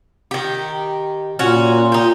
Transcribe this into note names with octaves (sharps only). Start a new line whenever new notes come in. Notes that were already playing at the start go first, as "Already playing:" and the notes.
D#3 G4
A#2 C#4 F#4
D#4 G4